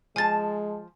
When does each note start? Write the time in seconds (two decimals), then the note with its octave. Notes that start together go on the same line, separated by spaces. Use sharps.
0.16 F3 G#3 G#5 A5 A6